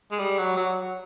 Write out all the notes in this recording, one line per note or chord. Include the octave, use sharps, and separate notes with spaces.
G#3
G3
F#3
F#3